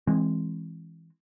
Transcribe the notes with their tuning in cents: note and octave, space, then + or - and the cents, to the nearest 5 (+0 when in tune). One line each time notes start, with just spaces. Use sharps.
E3 +0 G#3 +0 C4 +20